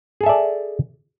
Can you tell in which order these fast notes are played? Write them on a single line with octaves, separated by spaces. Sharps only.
G#4 A4 E5 D5